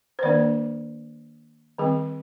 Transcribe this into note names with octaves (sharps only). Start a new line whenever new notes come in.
C5
D#3 A#3 D4 D5
D#3 G3 C4 G#4